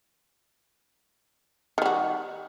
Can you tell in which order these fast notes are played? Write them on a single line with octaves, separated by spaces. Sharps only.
D#3 G3 F#4